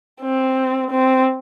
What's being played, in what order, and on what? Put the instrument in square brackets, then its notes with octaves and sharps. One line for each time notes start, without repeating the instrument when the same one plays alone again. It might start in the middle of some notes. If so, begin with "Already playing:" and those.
[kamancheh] C4
C4